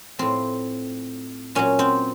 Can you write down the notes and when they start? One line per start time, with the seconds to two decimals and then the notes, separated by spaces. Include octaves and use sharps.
0.19 A2 F3 C4
1.55 A#2 F#3 C#4
1.79 C4